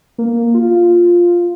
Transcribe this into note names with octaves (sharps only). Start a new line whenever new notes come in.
A#3
F4